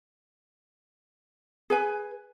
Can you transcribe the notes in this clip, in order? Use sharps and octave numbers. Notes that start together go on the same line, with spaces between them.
G#4 B4 G#5